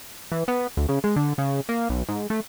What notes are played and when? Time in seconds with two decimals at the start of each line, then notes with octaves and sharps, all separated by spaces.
0.32 E3
0.48 B3
0.77 D2
0.89 C#3
1.04 G#3
1.16 D3
1.38 C#3
1.69 A#3
1.89 B1
2.09 G#2
2.30 A3